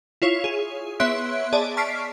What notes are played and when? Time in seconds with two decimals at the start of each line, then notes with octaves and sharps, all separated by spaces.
0.22 E4 F4 C#5
0.44 G#4
1.00 B3 C#5 E5 C6 F#6 D7
1.53 G#4 D5 D#5 A5
1.77 A5 C#6 F6 B6 C7 D7